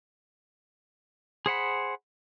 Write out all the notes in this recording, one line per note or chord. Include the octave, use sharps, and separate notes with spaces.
G#4 C5 F#5 B5